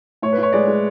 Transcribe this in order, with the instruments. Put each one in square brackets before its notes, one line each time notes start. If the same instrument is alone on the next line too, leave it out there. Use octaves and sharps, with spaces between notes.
[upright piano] A2 C#5
B4
A2
C#5
G#3 D5
G#3